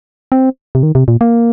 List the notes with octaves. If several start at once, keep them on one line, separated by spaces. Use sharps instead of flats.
C4
C3
D#3
C3
A#2
A#3